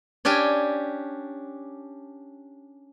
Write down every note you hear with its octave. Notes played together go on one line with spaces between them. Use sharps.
C#4 D4 G4 G5 G#5